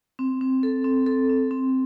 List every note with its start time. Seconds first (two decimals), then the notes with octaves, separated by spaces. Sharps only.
0.19 C4
0.41 C4
0.63 A4
0.84 C4
1.06 A4
1.29 C4
1.51 C4